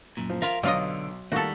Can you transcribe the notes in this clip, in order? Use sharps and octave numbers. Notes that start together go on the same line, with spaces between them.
F#2 A#2
F3
F4 A#4 E5 F5
B1 D3 F#3 F4 D#5 F5
D#3 G3 A3 A#3 F4 F#4 A4